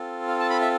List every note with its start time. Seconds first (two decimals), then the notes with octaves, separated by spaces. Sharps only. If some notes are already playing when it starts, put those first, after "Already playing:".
Already playing: C4 F4 A4
0.28 F5
0.40 A5
0.50 B5
0.61 E5